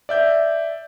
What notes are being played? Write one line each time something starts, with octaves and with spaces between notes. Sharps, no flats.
D5 E5 G6